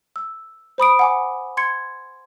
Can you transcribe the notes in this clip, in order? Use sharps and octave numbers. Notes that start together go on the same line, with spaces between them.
E6
C5 B5 D#6 D7
F#5 G#5 D6
C6 G#6 C#7